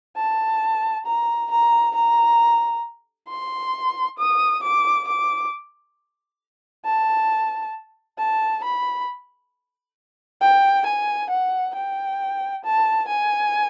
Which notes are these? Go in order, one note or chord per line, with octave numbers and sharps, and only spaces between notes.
A5
A#5
A#5
A#5
C6
D#6
D6
D6
A5
A5
B5
G5
G#5
F#5
G5
A5
G#5